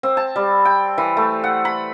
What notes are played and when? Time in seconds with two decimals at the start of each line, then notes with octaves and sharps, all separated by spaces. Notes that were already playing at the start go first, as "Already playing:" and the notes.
0.03 C4
0.17 A5
0.36 G3
0.65 G5
0.98 E3
1.17 A3
1.44 F#5
1.65 B5